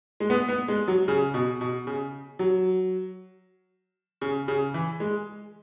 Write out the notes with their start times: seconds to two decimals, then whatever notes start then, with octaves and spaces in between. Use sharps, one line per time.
0.20 G#3
0.30 B3
0.49 B3
0.68 G#3
0.88 F#3
1.08 C#3
1.34 B2
1.61 B2
1.87 C#3
2.39 F#3
4.21 C#3
4.48 C#3
4.74 E3
5.00 G#3